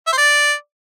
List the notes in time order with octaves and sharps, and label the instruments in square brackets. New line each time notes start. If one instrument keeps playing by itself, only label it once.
[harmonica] E5
C5
D5